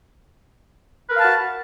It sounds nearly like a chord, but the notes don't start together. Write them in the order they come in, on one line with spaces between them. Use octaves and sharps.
B4 A#4 F5 A5 F#4